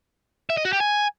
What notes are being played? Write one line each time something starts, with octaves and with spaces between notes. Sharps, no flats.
E5
D#5
F#4
G4
G#5